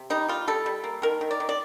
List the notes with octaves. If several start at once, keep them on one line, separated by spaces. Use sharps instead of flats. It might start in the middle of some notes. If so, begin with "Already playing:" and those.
Already playing: C3
G3 D#4
G3 F4
G3 A4
G3
A#3
D#3 A#4
D#3
D5
D#3
D5